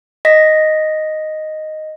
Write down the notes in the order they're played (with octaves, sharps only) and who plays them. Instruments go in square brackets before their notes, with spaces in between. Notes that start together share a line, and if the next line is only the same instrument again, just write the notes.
[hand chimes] D#5 A#6 B6